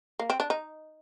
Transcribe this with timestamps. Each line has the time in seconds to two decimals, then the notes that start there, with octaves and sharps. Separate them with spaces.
0.19 A#3
0.30 C4
0.40 D4
0.50 D#4